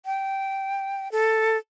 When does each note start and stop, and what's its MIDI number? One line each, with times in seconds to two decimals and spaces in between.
0.06 1.11 79
1.12 1.57 69